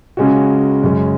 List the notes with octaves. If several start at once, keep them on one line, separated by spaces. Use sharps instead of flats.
C#3 G#3 C#4 F#4
F#2 C#3 G#3 C#4